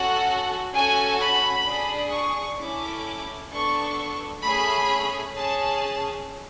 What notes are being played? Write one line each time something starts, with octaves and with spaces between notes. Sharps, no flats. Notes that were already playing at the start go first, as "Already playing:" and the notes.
Already playing: C#4 F#4 A4 F#5
C#4 F#4 A4 G#5
B5
D4 G#4
C#6
C#4 E4 A4 D6
B3 D4 A4 C#6
A3 C#4 G#4 B5
C#4 G#4 A5